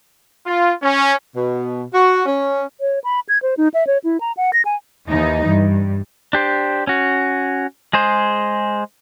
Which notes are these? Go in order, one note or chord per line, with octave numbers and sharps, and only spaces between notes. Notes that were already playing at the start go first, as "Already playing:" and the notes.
F4
C#4
B2
F#4
C#4
C#5
B5
G#6
C5
D#4
E5
C#5
E4
A#5
F#5
A#6
G#5
D#2 E3 D#4
G2
D4 G4 C5
C#4 F#4
G#3 G#4 C5